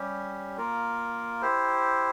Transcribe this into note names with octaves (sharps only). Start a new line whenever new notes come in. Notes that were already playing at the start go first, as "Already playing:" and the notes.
Already playing: G3 C#4 G4
A#3 F4 A#4
E4 G4 C5